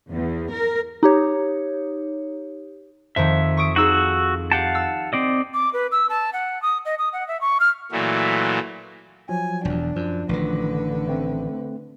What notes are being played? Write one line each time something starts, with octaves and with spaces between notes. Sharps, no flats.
E2
A#4
D#4 G4 C#5
F2 D#3 E5
C#6 D#6 D7
D#4 F#4 G#4 E6
G4 F5 F#5 A5
E6
C4 D5 D#5
D6
B4
E6
A5
F#5
D#6
D#5
D#6
F#5
E5
C#6
F6
A#2 E3 F#3 A3
F3 F#3 G#5
E1 E2 D4
F#2 F3
A1 D3 D#3 B4
A3 C4